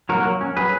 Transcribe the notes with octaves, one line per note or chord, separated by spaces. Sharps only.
F#3 A#3 F#4 A#4
F#3
C#4
F#3 G#4 B4